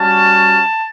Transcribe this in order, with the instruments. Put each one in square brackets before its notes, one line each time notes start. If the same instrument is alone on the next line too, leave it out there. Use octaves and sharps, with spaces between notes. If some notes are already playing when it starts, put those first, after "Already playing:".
Already playing: [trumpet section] G3 C#4 F#4 A5